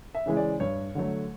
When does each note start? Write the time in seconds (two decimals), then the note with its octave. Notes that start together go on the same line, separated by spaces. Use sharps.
0.15 E5
0.26 C#3 E3 G#3
0.37 D5
0.60 G2 C#5
0.95 D3 F#3 A3